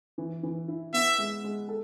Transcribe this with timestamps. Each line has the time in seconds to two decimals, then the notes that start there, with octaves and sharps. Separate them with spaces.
0.18 E3
0.43 E3
0.68 E4
0.94 B3 E5
1.18 G#3
1.44 G#3
1.69 A4